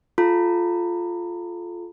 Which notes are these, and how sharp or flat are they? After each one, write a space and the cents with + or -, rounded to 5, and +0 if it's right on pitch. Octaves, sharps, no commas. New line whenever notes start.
F4 +0 A4 -30 A#5 -30